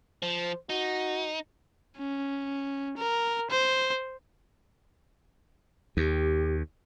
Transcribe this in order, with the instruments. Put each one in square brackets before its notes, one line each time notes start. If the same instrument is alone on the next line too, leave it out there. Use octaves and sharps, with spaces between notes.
[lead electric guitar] F3 [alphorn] C5
[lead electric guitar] D#4 [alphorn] F#4
[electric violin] C#4
A#4
C5
[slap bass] D#2 [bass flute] G4